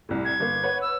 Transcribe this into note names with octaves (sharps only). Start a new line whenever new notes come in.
C2 A2
G#6
G1 A#3
B4 C#5 F#5
E6